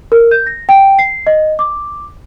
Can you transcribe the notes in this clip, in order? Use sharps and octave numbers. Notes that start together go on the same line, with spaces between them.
A#4
G6
A#6
G5
C7
D#5
D6